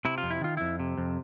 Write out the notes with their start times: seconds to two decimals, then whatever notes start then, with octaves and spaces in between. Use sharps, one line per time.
0.05 C3 E4
0.18 F4
0.23 F2
0.31 E4
0.42 D#3 F4
0.57 F2 E4
0.80 C3
0.98 F2